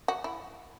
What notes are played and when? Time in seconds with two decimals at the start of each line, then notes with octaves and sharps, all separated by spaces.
0.08 F#4
0.24 E4